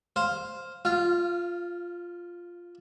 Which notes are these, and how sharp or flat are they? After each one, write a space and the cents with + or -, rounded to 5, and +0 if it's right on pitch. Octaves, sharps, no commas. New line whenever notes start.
C5 +0 F5 +0
F4 +0 F5 -25